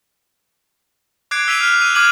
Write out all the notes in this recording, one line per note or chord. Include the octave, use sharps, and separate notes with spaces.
D6 F#6 G#6 C7 D7
E6 B6 D#7 F7
F6
E6 D#7 F7
D6 F6 G#6 D#7 F7 F#7